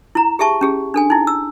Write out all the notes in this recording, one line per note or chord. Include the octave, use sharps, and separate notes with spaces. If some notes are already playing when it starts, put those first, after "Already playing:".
E4 A#5
G4 G#4 E5 A5 C#6
C#4 G4 G#4
D4 A4 G#5
D#4 E4
E6